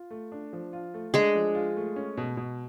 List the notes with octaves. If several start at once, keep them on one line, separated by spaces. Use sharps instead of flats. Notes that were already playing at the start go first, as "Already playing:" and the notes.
Already playing: F4
A3
D4
F3
F4
A3
G#3 D4 G#4
F3
F4
A3
C#4
B2
B2